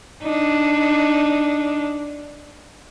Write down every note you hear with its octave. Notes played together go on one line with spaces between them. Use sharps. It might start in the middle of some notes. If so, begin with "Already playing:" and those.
D4 D#4